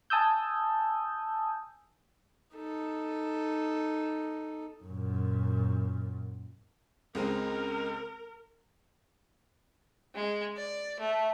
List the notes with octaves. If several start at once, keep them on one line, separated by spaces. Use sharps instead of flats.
G#5 A5 D#6 E6 G6
D#4 A4
F#2 A#2
C#2 G#3 C4 A#4
G#3
D5
A3